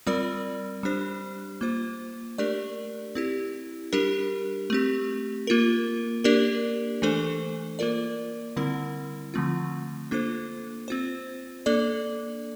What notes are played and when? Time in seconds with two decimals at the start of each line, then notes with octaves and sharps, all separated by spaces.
0.07 G3 C4 F4 A#4 D5
0.83 G3 D4 G4 C5
1.61 A#3 F4 C5
2.38 A3 D4 G4 A#4 D5
3.15 C4 E4 G4
3.93 G3 D4 G4 A#4
4.70 A3 C4 G4
5.47 A#3 F4 A#4
6.24 A#3 D4 G4 A#4 D5
7.02 E3 A3 D4 A4 C5
7.79 A#3 F4 A#4 D5
8.56 D3 G3 C4 E4 A#4
9.34 D3 F3 A3 C4 F4
10.11 A#3 D4 F4 A4 C5
10.88 C4 F4 C5
11.66 A#3 D4 A4 D5